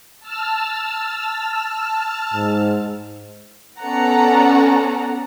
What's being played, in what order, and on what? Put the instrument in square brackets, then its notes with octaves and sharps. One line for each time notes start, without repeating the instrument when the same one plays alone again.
[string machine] A5 E6 F6
[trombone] G#2
[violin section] B3 C#4 A4 D5 F#5 A#5